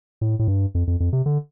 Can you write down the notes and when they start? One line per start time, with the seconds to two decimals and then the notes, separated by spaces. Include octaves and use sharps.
0.21 A2
0.39 A2
0.48 G2
0.75 F2
0.87 F2
1.00 F2
1.13 C3
1.26 D3